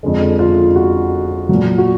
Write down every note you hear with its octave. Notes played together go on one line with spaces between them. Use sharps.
F2 D3 G#3
F4
F#4
A#2 F#3
F#4